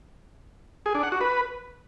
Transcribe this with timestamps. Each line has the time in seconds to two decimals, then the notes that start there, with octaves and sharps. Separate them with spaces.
0.86 G#4
0.95 D4
1.03 F#5
1.12 F#4
1.21 B4